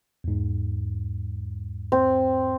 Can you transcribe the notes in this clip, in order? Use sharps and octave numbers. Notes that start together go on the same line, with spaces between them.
E2 G#2
C4